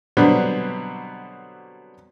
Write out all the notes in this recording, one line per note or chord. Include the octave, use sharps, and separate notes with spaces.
B2 D3 F#3 G3 B3 C4